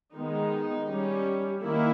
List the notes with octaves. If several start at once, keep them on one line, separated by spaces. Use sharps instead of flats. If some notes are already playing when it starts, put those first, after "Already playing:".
D#3 G#3 B3 D#4
G3 C#4
D#3 A#3 E4